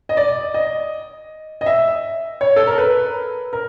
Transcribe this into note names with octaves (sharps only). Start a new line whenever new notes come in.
D#5
D5
D#5
D#5
E5
C#5
A4
A#4
B4
A#4